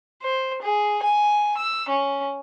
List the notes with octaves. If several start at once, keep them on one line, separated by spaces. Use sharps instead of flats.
C5
G#4
G#5
E6
C#4